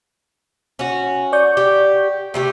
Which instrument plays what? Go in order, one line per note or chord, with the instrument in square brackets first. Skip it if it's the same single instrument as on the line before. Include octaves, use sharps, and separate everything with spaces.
[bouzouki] C#4 F#4
[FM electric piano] D5 C#6 G6
[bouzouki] G4
C3 A3 G4